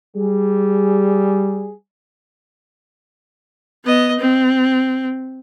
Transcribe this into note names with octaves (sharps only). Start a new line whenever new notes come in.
G3 G#4
B3 D#5
C4